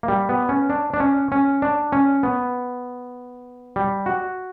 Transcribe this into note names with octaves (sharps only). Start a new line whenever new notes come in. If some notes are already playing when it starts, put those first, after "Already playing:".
A#3
G3
B3
C#4
D4
D4
C#4
C#4
D4
C#4
B3
G3
F#4